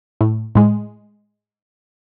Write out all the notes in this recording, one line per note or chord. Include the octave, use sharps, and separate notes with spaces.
A2
A2 G#3